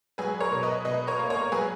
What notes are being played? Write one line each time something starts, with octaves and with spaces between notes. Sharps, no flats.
F#3 G#4 B4
A#4 C#5
B2
B4 D#5
B2 B4 D#5
A#4 C#5
A#3
A#4 C#5
F#3 G#4 B4